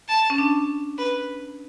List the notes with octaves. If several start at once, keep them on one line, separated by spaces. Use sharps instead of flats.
A5
C#4
D4
B4